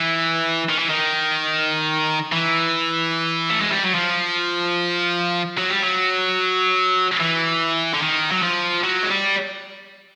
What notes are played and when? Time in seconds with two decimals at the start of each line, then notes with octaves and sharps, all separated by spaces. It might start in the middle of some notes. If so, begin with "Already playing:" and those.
Already playing: E3
0.69 D#3
0.79 E3
0.90 D#3
2.32 E3
3.50 A3
3.60 G#3
3.71 G3
3.83 F#3
3.95 F3
5.58 F#3
5.70 G3
5.82 F#3
7.20 E3
7.94 D3
8.02 D#3
8.31 F#3
8.42 F3
8.83 F#3
9.03 G#3
9.10 G3